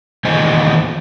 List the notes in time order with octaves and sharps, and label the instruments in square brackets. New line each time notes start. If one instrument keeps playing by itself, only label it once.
[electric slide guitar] E2 A#2 D#3 C5 D#5 G#5